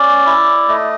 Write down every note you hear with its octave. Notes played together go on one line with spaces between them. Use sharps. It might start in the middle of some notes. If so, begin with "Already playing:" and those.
Already playing: C#4 D5
E4
A3 D#5